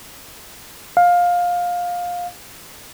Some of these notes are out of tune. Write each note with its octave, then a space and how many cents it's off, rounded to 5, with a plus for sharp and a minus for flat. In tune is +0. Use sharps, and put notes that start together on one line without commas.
F5 +15